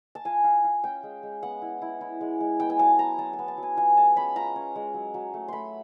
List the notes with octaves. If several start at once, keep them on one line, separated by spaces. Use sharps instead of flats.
A5
F4 G#5
F4
F4
C#4 G5
G#3
G#3
B3 F#5
E4
E4
E4
G#3
G#3
B3 G5
G#5
F#3 A5
B3 A#5
F#3 A5
A5
B3
A5
F#3
G#5
F4 G#5
G#3 A5
C#4 B5
F4 A#5
C#4
G#3
F#3
F#3
A3
A3 B5 C6